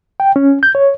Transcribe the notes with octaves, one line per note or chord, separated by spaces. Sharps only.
G5
C#4
G6
C#5